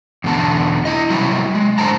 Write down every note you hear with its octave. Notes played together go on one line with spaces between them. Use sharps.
E2 B2 D3 A5
E4 D#5
C3 F#3 G3 E4
G#3
A2 D3 C5 A5 A#5